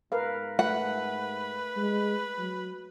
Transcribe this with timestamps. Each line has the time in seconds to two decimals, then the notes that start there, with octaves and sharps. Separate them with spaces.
0.12 G#2 A#4 B4 F5
0.59 A3 B4 F#5
1.77 G#3
2.39 F#3